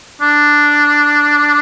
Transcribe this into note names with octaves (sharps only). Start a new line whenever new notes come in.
D4